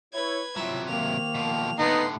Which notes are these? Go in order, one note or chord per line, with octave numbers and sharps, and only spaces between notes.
E4 B4 C#5 G#6
C3 F#3 E4 F4 C#5 E5
C2 D#3 A#3 F7
B2 F3
A2 D3 B3 D#4 C6 C7